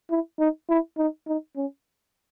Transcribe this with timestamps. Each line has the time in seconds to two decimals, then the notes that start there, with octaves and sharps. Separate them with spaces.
0.10 E4
0.39 D#4
0.69 E4
0.98 D#4
1.27 D#4
1.57 C#4